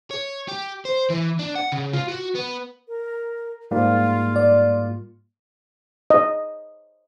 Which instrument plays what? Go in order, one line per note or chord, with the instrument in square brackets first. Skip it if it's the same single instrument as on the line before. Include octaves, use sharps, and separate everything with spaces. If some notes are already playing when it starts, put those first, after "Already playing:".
[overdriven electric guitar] C#5
G4
C5
E3
D4
F#5
C#3
F4
F#4
B3
[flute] A#4
[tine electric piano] G#2 G3 A#3 [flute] F4
[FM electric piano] D5
[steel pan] D#5